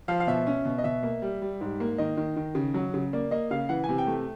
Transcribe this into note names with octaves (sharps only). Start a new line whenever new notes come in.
F3 F5
F5
B2 E5
C#4
B2
D#5
B2 E5
A#3
G3
G3
G#2
A#3
D#3 D#5
D#3
D#3
C#3
F#3
C#3
A#3 D5
A#3 D#5
C#3 F5
E3 F#5
G#5
C3
G5
A3